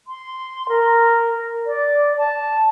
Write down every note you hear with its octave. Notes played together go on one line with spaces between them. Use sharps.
C6
A#4
D5
A5